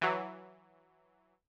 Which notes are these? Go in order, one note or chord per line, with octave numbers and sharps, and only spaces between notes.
E3 F#3